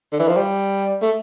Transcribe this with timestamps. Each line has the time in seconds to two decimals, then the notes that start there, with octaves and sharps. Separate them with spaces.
0.12 D3
0.20 E3
0.28 F3
0.36 G3
1.02 A3